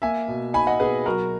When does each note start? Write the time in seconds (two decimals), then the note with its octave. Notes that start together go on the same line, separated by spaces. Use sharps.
0.02 A#3 E5 G#5
0.28 B2
0.53 D#4 G#5 B5
0.67 D#5 F#5
0.80 B2 G#4 B4
1.06 F#3 F#4 A#4